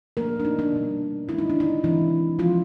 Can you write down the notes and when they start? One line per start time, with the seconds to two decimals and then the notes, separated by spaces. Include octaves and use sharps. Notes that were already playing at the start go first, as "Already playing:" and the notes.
0.17 F3 A3 A#3 D4 A#4
0.40 D4
0.45 D#4
0.59 D4
0.72 B2 G3 B3 D4
1.27 D#3 G#3 C#4 E4
1.38 D#4
1.50 D4
1.60 D#4
1.83 C3 D#3 E3 G#3 C4 E4
2.39 F3 G#3 C#4 F4